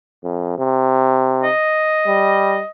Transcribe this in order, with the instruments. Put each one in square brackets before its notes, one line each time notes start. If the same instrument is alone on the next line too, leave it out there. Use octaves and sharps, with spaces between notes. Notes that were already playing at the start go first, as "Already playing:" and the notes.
[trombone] F2
C3
[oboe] D#5
[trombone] G3